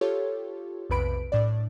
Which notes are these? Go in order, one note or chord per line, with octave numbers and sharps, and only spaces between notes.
F4 G4 A4 C#5
B1 F2 C3 B4 B5 D7
A2 D4 D5